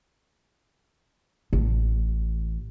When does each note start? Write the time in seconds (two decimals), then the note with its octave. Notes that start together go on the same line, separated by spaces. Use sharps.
1.53 A1